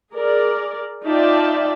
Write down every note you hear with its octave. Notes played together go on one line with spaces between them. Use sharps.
G#4 A#4 D5
D#4 F4 D5 E5 G5 A5